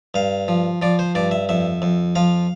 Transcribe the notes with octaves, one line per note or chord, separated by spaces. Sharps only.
G2 F5
F3
F3 D5
C5
G2 D5
E5
F2 E5
F2
F3 F5